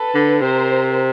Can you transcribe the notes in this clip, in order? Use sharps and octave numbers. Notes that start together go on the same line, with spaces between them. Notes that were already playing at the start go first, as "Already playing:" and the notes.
Already playing: A4 B4
D3
C3 A#4 C5